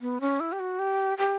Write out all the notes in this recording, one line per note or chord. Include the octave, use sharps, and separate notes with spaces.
B3
C#4
E4
G4
F#4
G4
G4